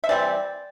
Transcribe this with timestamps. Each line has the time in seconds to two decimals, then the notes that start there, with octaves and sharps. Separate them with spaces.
0.04 E5
0.09 E3 G3 C4 D5